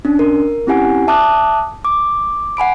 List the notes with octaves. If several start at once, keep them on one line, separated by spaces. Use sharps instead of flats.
C#4 D4
A#4
C4 C#4 E4 G4 F#5 G#5
E5 A5 D6 D#6 F#6
D6
F#5 G#5 B5 D7